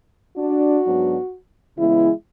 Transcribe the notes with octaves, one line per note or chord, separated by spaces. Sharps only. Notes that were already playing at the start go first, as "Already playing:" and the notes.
D4 F#4
G#2 F#3 B3 D4
C#3 E3 G#3 B3 E4